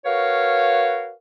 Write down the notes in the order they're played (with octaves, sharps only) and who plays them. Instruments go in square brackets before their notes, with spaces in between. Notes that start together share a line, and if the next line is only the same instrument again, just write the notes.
[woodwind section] F#4 A#4 B4 C#5 F5